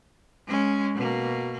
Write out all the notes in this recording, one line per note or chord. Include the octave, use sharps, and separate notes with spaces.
G#3 C#4
B2 A#3